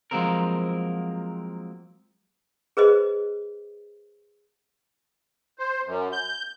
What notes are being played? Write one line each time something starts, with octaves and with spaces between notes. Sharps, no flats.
F3 F#3 G#3 A#3 C4 A#4
G#4 B4 C5 D#5
C5
F#2
G6